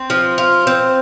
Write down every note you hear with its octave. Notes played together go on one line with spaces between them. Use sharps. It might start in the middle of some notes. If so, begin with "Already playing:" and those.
Already playing: C4
F3
F4
C4